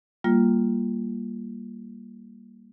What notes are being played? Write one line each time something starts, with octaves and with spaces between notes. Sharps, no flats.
G3 A#3 F4